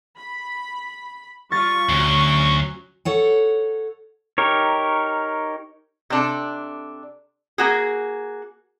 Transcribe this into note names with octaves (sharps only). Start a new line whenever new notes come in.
B5
G3 F4 C#6 A6
D2 F#3 C#4
A4 C#5 F#5
D#4 G4 A#4 C#5
C3 D4 A4
A#3 F#4 G#4